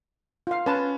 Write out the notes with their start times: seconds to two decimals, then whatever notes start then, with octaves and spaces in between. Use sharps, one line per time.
0.47 F4 F5
0.66 C#4 B4 A5